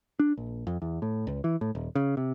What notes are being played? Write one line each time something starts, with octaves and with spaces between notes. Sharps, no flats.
D4
A#1
F2
E2
A2
C#2
E3
A2
D#1
C#3
C3